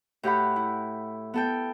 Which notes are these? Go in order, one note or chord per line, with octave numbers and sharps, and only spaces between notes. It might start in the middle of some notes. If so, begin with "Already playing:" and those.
A2 G4 F#5 B5
E4
B3 A4 G5